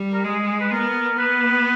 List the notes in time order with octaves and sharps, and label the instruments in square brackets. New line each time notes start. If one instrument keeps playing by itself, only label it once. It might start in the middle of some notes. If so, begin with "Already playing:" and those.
Already playing: [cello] G3
[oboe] A#4
[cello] G#3 [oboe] G#4
[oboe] G#4
B4
[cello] B3 [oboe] A#4
[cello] B3 [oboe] B4